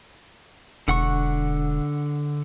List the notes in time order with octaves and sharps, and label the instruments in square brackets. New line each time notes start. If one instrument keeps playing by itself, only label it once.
[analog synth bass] E1 [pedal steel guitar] D3 F#5 C#6